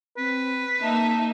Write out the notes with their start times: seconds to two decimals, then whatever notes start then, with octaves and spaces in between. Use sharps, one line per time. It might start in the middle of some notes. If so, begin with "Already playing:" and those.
0.18 C4 B4
0.82 A#3 D#4 E5 A5